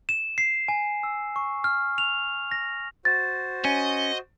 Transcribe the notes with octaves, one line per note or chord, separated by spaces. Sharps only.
E7
C7
G#5
E6
C#6
F6
F7
A#6
F#4 C5 A6
C#4 D#5